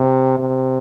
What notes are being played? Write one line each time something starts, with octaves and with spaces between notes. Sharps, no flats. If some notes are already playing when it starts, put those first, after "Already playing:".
Already playing: C3
C3